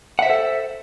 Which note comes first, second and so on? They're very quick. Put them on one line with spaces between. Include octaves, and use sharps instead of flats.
F#5 E5 C5 A4